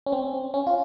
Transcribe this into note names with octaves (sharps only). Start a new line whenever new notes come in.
C#4
C4
C#4
F4